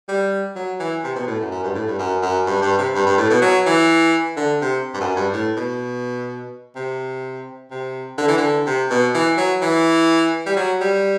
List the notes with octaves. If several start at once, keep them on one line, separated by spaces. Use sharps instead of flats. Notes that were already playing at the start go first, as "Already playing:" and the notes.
G3
F#3
E3
C3
B2
A2
F#2
F#2
G2
A2
G2
F#2
F#2
G2
G2
C3
G2
G2
A2
B2
F#3
E3
D3
C3
G2
F#2
G2
A2
B2
C3
C3
D3
E3
D3
C3
B2
E3
F#3
E3
G3
F#3
G3